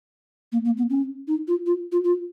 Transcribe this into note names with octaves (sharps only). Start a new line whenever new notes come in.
A#3
A#3
B3
C#4
D#4
F4
F4
F4
F4